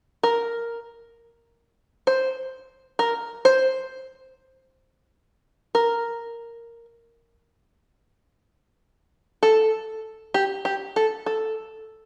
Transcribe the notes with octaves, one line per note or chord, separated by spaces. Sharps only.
A#4
C5
A#4
C5
A#4
A4
G4
G4
A4
A4